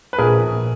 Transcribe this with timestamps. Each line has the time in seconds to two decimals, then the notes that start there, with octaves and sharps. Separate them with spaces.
0.13 B4
0.18 A#1 G#4 A#4
0.41 A#1